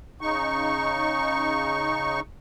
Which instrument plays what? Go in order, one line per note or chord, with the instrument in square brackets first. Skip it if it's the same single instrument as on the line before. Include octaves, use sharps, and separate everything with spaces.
[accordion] C#3 D#4 C#6